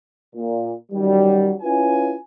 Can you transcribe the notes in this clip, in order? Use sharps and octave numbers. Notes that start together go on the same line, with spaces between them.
A#2
F#2 D#3 F#3 G3
C#4 E4 F4 B4 G#5